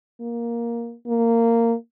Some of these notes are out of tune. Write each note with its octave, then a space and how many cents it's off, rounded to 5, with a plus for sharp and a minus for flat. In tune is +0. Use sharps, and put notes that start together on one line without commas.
A#3 +10
A#3 -15